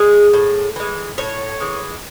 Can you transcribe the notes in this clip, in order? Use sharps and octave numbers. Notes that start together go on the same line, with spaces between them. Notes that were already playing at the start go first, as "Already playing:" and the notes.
Already playing: G#3 G#4
A2
E3 G#3
A2 C#5
E3 G#3